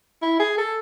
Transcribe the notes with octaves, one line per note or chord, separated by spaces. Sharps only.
E4
G#4
A4